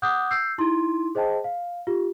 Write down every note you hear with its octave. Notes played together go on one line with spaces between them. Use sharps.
F#5 D6 D#6 F#6 G6
E6 G6 C7
D#4 E4 C6
G#4 C5 D#5 G5 A5
F5
F4 G4